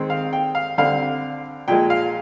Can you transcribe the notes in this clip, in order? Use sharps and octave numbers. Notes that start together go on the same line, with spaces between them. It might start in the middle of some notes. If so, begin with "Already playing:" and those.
Already playing: D#3 G#3 C4
F5
G5
F5
D3 G3 C4 F5
A#2 F3 G#3 G5
F5